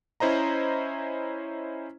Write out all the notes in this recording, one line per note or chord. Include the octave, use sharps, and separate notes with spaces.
C#4 E4 C5 D#5 A#5